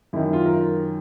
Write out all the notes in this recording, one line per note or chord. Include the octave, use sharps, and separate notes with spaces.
F#2 D#3 E4
F4
A#4